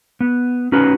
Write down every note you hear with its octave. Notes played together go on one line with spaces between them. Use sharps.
B3
C#4 D#4 F#4 B4